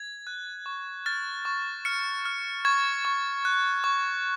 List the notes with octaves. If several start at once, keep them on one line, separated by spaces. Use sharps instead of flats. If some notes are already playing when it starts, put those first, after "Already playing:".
Already playing: G#6
F#6
C#6
F6 A6
C#6
F6 C#7
F6
C#6 G#6
C#6
F#6
C#6